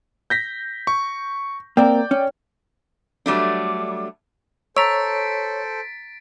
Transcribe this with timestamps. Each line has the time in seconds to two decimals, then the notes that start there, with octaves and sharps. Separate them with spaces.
0.30 G6 A#6 B6
0.87 C#6
1.77 A#3 C4 A#4 D5 G5
2.11 C#4
3.26 F#3 G3 A3 D4
4.77 A4 C5 C#5 A#5 E6 A6 B6 D7